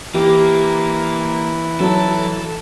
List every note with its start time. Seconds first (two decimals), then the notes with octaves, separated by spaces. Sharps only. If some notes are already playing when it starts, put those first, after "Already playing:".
0.14 E3 A#3 G4
1.80 F#3 F#4 A4 A5